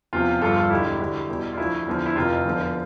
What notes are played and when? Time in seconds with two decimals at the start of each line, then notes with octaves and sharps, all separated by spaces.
0.13 E2 C3 F3 F4
0.41 G1 G2 F3 F4 A4
0.56 F4 A4
0.70 E1 D2 D3 E4 G4
1.00 D2 D3 G3
1.29 E2 B2 G3
1.53 F4
1.58 D2 D3 F3 E4
1.87 E2 D3 F3
2.06 E4
2.16 F1 F2 C3 F4
2.45 F1 E2 D3 F3